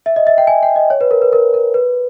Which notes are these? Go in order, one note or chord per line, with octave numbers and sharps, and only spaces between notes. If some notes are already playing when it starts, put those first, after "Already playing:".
E5
D#5
E5
G5
G#5
G5
D#5
C#5
B4
A#4
B4
A#4
A#4
B4